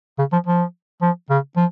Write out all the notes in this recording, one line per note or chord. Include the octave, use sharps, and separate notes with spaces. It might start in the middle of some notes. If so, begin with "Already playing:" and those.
C#3
F3
F3
F3
C#3
F3